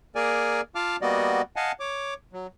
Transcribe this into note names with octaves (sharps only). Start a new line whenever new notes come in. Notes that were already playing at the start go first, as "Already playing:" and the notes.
A#3 G#4 A#4 D5 G#5
F4 F5 A5 D6 F6
G3 A#3 B3 F#4 D5 D#5
D#5 F5 F#5 G#5 A5
C#5 D6
F#3